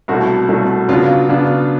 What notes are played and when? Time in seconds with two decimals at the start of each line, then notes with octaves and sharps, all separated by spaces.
0.08 C2 B2 F#3 A3 F#4
0.48 C2 B2 F#3 A3
0.89 C#3 F#3 B3 D4 F4
1.29 C#3 F#3 B3 D4